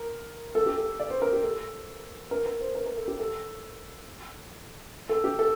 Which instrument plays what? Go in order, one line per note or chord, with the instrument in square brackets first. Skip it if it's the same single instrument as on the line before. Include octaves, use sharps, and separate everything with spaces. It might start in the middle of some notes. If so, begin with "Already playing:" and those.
Already playing: [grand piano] A#4
A4
G4
A4
D5
C5
A#4
G4
A4
A#4
A#4
C5
A#4
A#4
A4
G4
A4
A4
G4
A4